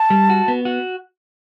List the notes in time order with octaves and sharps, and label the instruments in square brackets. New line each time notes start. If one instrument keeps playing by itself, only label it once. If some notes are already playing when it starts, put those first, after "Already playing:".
Already playing: [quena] A5
[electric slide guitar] G3
F#4
B3
F#4